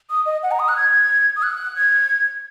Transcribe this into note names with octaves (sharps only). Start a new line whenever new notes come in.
D#6
D#5
F#5
A#5
D#6
F#6
G#6
D#6
F#6
G#6